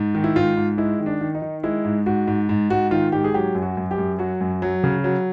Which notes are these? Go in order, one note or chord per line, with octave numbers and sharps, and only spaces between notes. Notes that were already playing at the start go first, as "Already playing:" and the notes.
Already playing: G#2
D#3
E4
G#2 F4
G#2
G#3 E4
D#3
D4
D#3
D#4
D#3
G#3 E4
G#2
G#2 F#4
G#2
G#2
G#2 F#4
D#3 F4
G#2 G4
G#4
F#3 G4
F#2
F#4
F#2
G4
F#2
F#3 F#4
F#2
F#3
C#3
F#3